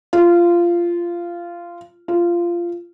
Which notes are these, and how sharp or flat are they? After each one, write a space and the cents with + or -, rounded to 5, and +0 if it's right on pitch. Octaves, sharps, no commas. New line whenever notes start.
F4 -15
F4 -15